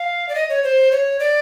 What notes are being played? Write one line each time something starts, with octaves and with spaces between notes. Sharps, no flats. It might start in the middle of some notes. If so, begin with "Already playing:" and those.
Already playing: F5
D5
D#5
C#5
C5
C#5
D5